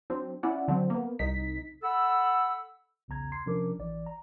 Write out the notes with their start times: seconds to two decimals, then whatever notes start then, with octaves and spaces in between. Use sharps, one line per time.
0.10 F#3 C4 D4
0.43 C#4 E4 D5 F#5
0.68 D3 F#3 C4
0.90 A#3 B3
1.19 C2 D#4 B6
1.82 A4 F#5 B5 E6
3.08 B1 E2 C#3 A#5 G#6
3.32 C6 G#6 C7
3.46 C3 F3 C#4 D4 A#4 D6
3.79 A1 E3 D5
4.06 A#5